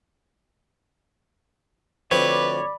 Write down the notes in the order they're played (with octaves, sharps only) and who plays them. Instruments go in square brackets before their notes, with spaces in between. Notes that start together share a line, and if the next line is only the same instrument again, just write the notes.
[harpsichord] D2 F3 C4 [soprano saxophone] B4 [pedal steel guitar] C#5 [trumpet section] D5 B5 D6